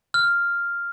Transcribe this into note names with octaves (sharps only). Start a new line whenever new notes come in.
F6